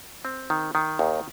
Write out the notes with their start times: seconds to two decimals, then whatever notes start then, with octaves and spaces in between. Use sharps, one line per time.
0.25 C4
0.50 D#3
0.75 D#3
0.99 D#2